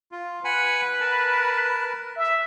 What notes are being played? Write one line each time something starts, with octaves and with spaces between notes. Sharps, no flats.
F4
B4 F#5 G#5 B5
A#4 A5
E5